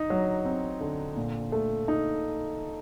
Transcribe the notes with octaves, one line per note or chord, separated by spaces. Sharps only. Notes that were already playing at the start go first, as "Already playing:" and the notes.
Already playing: D#4
F#3
C4
D3
A#2
A3
D#4